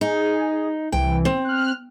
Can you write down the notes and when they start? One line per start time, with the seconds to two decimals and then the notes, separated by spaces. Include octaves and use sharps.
0.01 D#4 G#4
0.92 C2 E3 G5
1.25 C4
1.45 F6 F#6